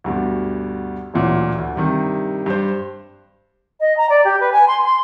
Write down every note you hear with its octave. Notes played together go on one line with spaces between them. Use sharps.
D2 G2 B2
A1 D2 A#2 E3 F#3
D2
G2 C3 D#3
G2 C5
D#5
A#5
D5
G4
B4
G#5
C6
C6